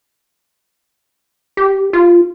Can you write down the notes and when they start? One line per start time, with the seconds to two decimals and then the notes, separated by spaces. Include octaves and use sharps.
1.57 G4
1.93 F4